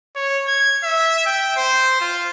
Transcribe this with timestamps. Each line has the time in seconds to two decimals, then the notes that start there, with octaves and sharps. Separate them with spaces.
0.16 C#5
0.47 G#6
0.84 E5
1.26 G5
1.56 C5
2.01 F4